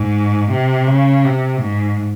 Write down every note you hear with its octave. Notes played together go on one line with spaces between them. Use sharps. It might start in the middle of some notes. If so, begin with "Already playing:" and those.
Already playing: G#2
C3
C#3
C3
G#2